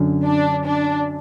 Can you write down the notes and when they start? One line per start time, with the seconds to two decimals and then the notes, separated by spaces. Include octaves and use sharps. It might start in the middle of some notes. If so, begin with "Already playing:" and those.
Already playing: F#2 D3 F#3
0.25 D4
0.65 D4